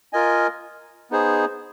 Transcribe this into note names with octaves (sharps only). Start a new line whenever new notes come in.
F4 A#4 D#5 G#5
B3 D#4 G#4 C5